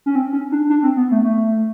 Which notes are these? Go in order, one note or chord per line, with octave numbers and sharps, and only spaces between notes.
C#4
C4
C#4
D4
D4
C4
B3
A3
A3